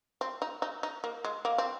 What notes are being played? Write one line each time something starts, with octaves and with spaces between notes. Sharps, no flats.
C4
D#4
D#4
D#4
A#3
G#3
A#3
C4